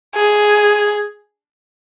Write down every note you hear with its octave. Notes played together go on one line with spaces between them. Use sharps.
G#4